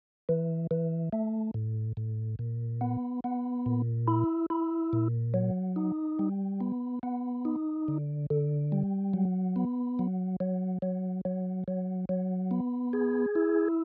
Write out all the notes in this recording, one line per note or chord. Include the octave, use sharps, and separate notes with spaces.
E3
E3
A3
A2
A2
A#2
B3
B3
A#2
E4
E4
A#2
F#3
D#4
G3
B3
B3
D#4
D3
D3
G3
F#3
B3
F#3
F#3
F#3
F#3
F#3
F#3
B3
G#4
E4